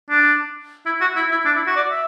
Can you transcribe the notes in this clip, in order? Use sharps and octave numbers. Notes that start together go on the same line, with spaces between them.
D4
E4
F#4
E4
E4
D4
E4
F#4
D5
E5